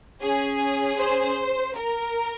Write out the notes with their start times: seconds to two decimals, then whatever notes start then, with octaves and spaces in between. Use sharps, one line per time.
0.21 C#4 G#4
0.98 C5
1.76 A#4